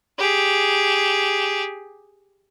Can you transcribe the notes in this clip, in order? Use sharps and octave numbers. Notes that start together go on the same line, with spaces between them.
G4 G#4